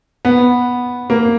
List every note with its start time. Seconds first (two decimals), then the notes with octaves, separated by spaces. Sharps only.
0.25 B3
1.10 A#3